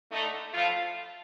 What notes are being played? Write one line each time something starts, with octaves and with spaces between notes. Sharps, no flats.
D3 A3 D#4
A2 F3 A3 F4